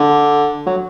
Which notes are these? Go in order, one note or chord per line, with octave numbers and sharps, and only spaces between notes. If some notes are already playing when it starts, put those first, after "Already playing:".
Already playing: D3
F#3